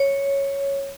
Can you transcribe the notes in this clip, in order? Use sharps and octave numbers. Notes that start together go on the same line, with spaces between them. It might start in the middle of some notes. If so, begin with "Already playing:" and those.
Already playing: C#5